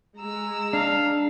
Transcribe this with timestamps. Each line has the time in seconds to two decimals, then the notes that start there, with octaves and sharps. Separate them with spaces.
0.18 G#3 A#5 E6
0.73 D4 F5